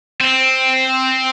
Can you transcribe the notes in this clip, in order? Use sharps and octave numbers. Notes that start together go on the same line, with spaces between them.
C4